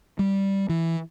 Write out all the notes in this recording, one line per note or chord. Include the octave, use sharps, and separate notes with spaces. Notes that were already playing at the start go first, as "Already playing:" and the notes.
G3
E3